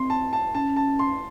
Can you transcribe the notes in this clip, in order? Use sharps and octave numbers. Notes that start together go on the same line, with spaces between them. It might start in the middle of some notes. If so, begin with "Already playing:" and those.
Already playing: C4 C6
A5
A5
C#4 A5
A5
C6